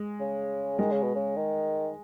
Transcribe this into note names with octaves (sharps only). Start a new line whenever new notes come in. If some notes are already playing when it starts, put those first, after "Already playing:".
Already playing: G#3
C#3
D#3 G#3
C#3
B2
C#3
D#3